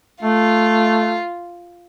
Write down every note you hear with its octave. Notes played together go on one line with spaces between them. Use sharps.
A3 F4